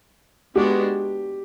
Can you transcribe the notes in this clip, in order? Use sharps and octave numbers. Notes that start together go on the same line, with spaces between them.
G#3 B3 D4 F#4 G4